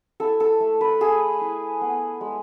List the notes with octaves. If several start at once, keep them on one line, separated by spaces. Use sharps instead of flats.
E4 A4
A4
A3
B4
A3 G#4
E4
B3
G#3